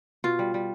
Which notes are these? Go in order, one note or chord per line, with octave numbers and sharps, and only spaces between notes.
B2 F4
G3
G3